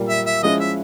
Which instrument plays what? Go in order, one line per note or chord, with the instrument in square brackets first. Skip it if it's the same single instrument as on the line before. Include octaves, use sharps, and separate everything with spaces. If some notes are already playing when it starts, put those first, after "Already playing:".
Already playing: [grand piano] A#2 G3 A#3
[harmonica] E5
E5
[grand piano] F3 G#3 C#4 E4 [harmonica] D#5
[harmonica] E5